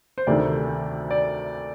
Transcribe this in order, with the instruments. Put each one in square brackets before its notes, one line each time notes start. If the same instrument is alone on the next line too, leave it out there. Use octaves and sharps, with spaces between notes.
[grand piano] C5
[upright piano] D2 C3 D#3 A3 [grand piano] D5
[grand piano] D5